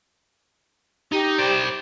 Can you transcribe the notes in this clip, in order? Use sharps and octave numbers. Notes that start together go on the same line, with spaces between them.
D#4 G4
C5 D5